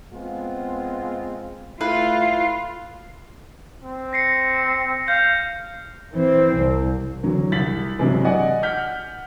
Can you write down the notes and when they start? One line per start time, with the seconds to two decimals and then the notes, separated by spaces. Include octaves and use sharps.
0.13 G#3 B3 C4 F4
1.81 A3 E4 F4 B4 F5
3.83 C4
4.13 A#6 C7 C#7
5.08 F5 G6
6.14 E3 C4
6.55 C2
7.23 E2 D3 F#3
7.52 C2 A6 B6 F#7
7.99 G2 C3 E3 F#3 G#3
8.25 D5 D#5 F#5 G#5
8.63 F#5 F6 G6 B6